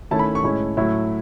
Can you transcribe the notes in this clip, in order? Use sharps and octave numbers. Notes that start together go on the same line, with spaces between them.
D#3 A3 C#4 E4 A5
B5
C#6
A2 G#3 C#4 E4
A2 F#3 A3 E4